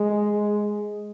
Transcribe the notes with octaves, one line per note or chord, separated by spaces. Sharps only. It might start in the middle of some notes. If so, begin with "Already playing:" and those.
Already playing: G#3